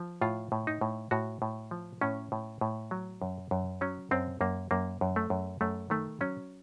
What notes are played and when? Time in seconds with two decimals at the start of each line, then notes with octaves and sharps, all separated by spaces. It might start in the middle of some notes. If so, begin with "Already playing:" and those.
Already playing: F3
0.21 A2 F4
0.52 A2
0.67 D#4
0.81 A2
1.11 A2 F#4
1.42 A2
1.71 F3
2.01 A2 C#4
2.32 A2
2.61 A2
2.91 F#3
3.22 F#2
3.51 F#2
3.81 F#3 C#4
4.11 F#2 C4
4.41 F#2 A#3
4.71 F#2 A#3
5.01 F#2
5.16 A3
5.30 F#2
5.61 F#2 A3
5.90 D#3 A3
6.21 F#3 C#4